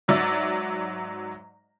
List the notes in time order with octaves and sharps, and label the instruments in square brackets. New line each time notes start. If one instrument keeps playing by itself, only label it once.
[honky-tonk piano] G#2 F#3 D5 E5 E6